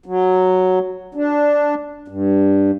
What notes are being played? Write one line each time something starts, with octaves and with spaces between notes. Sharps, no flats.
F#3
D4
G2